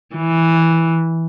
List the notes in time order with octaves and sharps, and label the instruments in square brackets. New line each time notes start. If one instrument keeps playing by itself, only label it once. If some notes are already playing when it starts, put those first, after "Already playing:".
[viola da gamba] E3